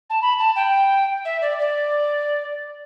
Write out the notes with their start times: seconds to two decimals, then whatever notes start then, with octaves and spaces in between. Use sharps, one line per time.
0.10 A5
0.22 B5
0.39 A5
0.56 G5
1.25 E5
1.41 D5
1.59 D5